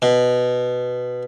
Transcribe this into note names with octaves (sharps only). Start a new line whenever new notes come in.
B2